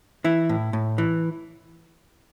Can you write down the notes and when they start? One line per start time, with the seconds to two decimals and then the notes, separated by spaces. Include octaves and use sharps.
0.24 E3 E4
0.49 A2
0.73 A2
0.98 E3